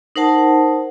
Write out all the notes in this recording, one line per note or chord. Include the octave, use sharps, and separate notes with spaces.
D#4 A#4 C5 F#5 A5